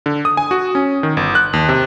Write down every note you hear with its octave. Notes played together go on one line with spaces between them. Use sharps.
D3
D#6
G#5
F#4
C#4
D#3
G1
F#6
D#2
C3